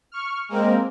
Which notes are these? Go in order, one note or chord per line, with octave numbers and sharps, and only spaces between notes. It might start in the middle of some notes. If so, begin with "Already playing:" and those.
C#6 F6
G#3 A#3 C4 A#4